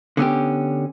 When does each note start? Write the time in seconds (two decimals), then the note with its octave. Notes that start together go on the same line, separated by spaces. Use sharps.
0.17 D3 B3 C#4 G4